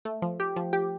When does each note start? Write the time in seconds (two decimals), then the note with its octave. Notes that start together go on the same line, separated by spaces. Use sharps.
0.05 A3
0.22 F3
0.40 G4
0.56 F3
0.73 G4